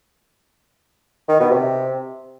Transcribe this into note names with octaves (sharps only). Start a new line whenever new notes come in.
D#3
B2
C3